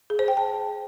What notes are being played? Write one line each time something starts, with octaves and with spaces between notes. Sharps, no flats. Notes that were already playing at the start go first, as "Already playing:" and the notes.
G#4
C5
G5
A5